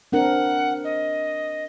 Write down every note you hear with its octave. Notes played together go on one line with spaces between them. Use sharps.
C4 D4 A#4 F#5
D#5